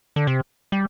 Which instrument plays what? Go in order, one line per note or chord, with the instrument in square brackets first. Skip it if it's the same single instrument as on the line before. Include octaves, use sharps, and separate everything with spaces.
[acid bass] D3
C3
G3